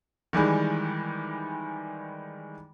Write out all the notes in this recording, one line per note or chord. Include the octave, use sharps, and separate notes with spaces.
D#3 E3 G3 G#3